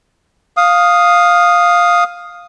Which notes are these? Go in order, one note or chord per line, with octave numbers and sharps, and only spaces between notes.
F5 D#6